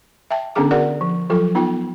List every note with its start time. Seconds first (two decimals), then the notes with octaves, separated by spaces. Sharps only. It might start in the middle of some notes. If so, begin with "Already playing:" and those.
0.30 E5 G5 A5
0.55 D3 B3 C#4 D4 G#4 D6
0.71 F#4 G#4 A#4 D5 F#5
1.01 F3
1.30 F3 F#3 F4 A4
1.55 B3 D#4 F4 G5